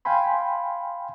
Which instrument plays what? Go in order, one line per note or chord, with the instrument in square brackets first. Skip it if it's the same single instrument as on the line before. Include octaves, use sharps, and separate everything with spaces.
[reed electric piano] F5 G5 G#5 B5 C6